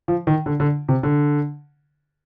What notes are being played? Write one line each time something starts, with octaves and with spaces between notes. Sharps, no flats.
F3
D#3
D3
D3
C3
D3